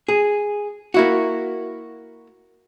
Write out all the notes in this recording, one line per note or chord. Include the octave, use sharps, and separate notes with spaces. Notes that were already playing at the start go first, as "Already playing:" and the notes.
G#4
A#3 E4 F#4